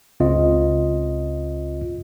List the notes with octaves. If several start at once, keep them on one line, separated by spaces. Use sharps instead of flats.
C#2 C#3 C4 F4 D#5